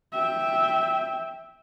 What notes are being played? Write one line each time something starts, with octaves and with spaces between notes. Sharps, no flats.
E5 G5